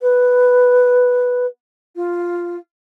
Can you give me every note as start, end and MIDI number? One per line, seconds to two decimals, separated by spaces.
0.01 1.46 71
1.96 2.56 65